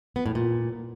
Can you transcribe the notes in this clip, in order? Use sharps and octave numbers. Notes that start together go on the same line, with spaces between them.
B3
A2
A#2